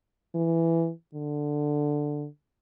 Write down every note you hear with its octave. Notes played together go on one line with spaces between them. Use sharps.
E3
D3